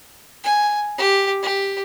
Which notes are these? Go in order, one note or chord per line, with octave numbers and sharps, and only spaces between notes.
G#5
G4
G4